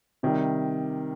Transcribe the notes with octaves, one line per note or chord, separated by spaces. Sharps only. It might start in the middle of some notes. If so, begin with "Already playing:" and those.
C3 D#3 G3